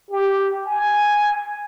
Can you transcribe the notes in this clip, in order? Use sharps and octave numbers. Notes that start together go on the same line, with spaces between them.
G4
G#5